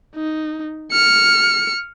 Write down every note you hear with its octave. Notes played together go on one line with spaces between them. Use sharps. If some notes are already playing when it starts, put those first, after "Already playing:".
D#4
F6 C#7